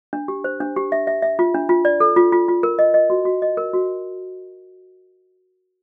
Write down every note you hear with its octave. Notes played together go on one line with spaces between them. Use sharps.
D4
G4
C5
D4
G4
E5
E5
E5
F4
D4
F4
D5
A4
F4
F4
F4
A#4
D#5
D#5
F#4
F#4
D#5
A#4
F#4